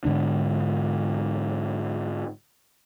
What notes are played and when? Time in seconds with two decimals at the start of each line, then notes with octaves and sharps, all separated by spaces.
0.05 G#2 D3 D4